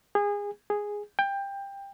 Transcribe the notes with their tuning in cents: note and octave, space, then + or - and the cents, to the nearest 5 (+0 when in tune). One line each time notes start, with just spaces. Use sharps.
G#4 -25
G#4 -5
G5 +20